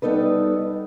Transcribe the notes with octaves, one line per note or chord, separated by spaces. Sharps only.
G3 B3 D#4 A4 B4